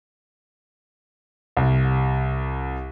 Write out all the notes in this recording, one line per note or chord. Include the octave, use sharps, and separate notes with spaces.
C2